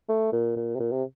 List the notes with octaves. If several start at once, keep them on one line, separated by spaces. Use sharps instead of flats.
A3
A#2
A#2
C3
A#2
C3